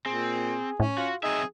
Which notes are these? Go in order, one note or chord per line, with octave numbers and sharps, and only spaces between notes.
A#2 C4 G#4
A2 C#4
F4 F#4
F#3 C4 D#4 G#4 E5